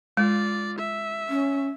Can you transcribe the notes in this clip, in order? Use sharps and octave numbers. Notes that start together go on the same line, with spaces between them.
G#3 F4 D5
E5
C#4